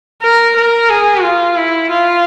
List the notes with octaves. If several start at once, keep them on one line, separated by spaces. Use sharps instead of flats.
A#4
A#4
G#4
F4
E4
F4